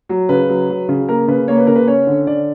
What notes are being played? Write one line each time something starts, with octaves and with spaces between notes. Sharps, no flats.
F#3
C#3 B4
F#3
F#3
C#3
A#3 A#4
C#3 B4
A#3 C#5
B4
C#3 A#4
B4
C#4 C#5
D3
D3 D5